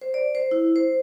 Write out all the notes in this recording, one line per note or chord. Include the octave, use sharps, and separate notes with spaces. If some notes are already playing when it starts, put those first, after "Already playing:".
C5
D5
C5
E4
C5